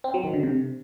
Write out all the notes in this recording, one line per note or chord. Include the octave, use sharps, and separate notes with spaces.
C4
F#3
D#3
D3
C3